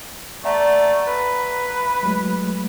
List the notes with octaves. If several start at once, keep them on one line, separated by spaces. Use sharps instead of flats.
A3 D5 E5 F#5 A#5
B4 B5
F#3 G#3 A3